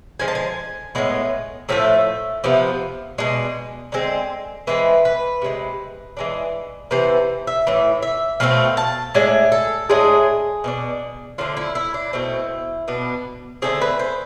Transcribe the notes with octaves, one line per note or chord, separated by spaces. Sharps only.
D3 F3 G#3 G#5
A5
G#5
A2 G#3 B3
A2 F3 A3 E5
C3 F3 B3
B2 G#3 D4
D3 G#3 C4
E3 G#3 C4 B4
B4
C3 F3 G#3
E3 G#3 D4
C3 E3 B3 C5
E5
A2 E3
E5
B2 A3 C4 F5
A5
A2 G#3 D4 G#5
A4
A2 G#3 D4 G#4
B2 B3 D4
D3 F3 A3 D4 F4
E4
E4
D4
B2 A3 C4 E4
B2 B3 D4
D3 A3 C4 G#4
B4
C5